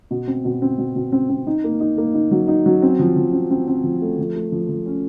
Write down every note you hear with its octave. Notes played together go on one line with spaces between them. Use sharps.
B2
C4
B2
C4
B2
B2
C4
C4
D#4
A#3
D#4
A#3
D#4
F#3
D#4
F#3
C4
F3
F3
C4
C4
C4
F3
A3
F3
A3
F3
F3
C#4